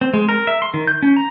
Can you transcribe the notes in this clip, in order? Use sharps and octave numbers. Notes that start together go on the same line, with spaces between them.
C4
G#3
A#4
E5
C6
D#3
G6
C#4
A#5